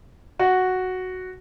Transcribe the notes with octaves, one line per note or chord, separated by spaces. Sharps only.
F#4